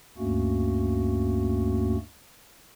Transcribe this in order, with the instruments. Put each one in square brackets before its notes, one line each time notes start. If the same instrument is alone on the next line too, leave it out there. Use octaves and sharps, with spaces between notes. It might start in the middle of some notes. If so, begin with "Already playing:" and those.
[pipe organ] D2 G2 A3 A#3 C#4 F#4